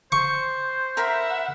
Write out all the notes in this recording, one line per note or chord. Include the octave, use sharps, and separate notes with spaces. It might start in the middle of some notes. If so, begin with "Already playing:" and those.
C5 C#6
A#4 E5 F#5 B5